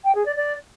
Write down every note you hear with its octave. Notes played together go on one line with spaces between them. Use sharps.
G5
G#4
D5
D5